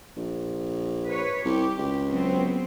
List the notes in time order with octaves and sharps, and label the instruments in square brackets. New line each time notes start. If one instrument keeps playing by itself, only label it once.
[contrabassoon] A#1
[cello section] B4 C#5
[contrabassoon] C2 [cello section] G4
[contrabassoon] C#2
[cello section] F#3 B3 C4